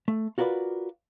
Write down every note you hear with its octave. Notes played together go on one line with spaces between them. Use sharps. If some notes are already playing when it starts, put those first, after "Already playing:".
A3
F4 F#4 A#4 B4 D5